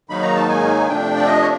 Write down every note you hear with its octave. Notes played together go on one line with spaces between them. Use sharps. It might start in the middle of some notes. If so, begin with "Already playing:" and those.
G#2 D#3 F#3 A#3 D#4 B5
A#5
A5
G#5
C3 F3 A3 D4 G5
D5
D#5
C#5